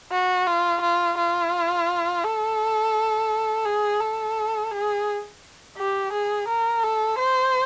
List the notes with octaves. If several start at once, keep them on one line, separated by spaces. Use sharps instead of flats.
F#4
F4
F4
F4
A4
G#4
A4
G#4
G4
G#4
A#4
A4
C5